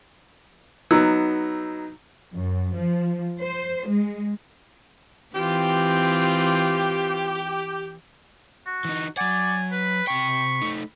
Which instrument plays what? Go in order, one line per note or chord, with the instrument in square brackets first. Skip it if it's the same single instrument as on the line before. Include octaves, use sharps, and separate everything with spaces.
[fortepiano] F#3 B3 E6 [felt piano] D#4
[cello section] F#2
F3
C5
G#3
[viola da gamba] E3 C4 F4 [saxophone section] G4
[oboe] F#4
[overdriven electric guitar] E3 D#4
[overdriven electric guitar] F#3 F#5 [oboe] D5 [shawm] G#5
[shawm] B4 [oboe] B5
[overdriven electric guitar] C3 G5 [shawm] C#6
[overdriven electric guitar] A3 D#4